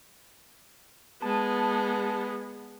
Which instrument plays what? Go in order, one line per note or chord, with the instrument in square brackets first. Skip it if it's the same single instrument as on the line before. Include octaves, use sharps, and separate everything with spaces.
[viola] G#3 B3 [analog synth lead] A5